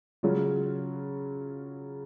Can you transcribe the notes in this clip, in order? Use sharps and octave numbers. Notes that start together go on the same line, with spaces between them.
C#3 F#3 C#4 F4